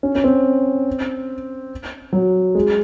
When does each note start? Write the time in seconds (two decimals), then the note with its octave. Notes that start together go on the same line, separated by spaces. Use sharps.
0.03 C#4
0.15 C#4
0.24 C4
2.13 F#3
2.55 G#3